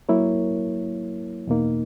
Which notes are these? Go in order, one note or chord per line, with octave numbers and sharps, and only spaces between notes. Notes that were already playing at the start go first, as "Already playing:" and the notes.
F#3 A#3 E4 A#4 C#5
E2 B2 A#3 D#4